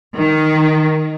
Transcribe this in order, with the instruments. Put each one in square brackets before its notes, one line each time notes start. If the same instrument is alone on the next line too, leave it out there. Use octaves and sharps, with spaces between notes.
[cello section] D#3